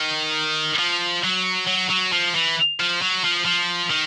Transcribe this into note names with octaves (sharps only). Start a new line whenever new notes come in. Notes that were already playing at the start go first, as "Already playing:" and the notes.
Already playing: D#3
F3
F#3
F#3
F#3
F3
E3
F3
F#3
F3
F3
D#3